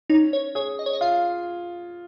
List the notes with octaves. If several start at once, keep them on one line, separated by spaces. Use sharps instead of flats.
C#4 D#4
C#5
G#4 C#5
D#5
C#5
D#5
F4 F5